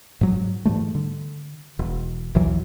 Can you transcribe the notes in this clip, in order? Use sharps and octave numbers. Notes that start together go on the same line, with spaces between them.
G#2 F#3
G#2 E3 G3 A3
D3
E1
A#1 D#2 E3 F#3